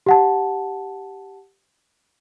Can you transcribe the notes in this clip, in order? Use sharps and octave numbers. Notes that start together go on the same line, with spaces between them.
G4 F#5 A5